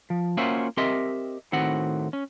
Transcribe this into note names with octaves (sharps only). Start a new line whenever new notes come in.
F3
A#3 C#4 F4 F#4 C5 E5
C4 G4 A#4 D#5 E5 C6
A2 D#3 C4 F#4 F#5
C#4